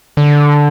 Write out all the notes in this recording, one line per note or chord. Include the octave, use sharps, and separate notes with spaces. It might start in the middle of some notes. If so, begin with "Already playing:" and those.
D3